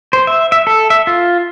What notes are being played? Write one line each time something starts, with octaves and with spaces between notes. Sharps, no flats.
C5
E5
E5
A4
E5
F4